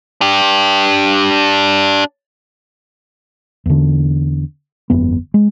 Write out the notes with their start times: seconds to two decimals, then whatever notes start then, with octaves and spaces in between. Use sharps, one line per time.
0.21 D4 G4
3.66 E2 D3
4.90 G1 F2 B3
5.34 G#3